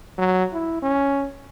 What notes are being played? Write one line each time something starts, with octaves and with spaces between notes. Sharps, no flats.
F#3
E4
C#4